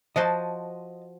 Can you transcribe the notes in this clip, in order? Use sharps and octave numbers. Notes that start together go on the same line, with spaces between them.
F3 F#4 C5 D#5 A5